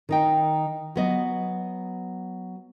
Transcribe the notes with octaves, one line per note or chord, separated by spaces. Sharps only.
D#3 D#4 G5
F#3 B3 D#5